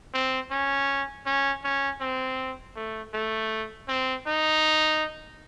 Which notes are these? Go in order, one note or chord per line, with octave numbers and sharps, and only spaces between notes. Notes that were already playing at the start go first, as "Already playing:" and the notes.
C4
C#4
C#4
C#4
C4
A3
A3
C4
D#4